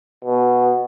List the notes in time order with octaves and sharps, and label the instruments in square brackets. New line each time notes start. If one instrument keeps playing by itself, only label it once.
[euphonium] B2